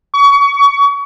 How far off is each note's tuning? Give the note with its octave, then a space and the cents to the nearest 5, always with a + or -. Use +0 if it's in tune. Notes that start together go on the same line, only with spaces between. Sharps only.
C#6 +30